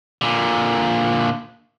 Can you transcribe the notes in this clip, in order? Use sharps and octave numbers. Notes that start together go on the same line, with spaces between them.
A#2 D3